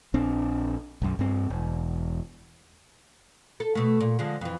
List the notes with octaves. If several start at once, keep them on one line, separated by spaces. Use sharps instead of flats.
A#1 C4 D4
B1 F#2
G2 C4
E1
A4
B2 A3
A#2
D3 F3 G#3
F2 E3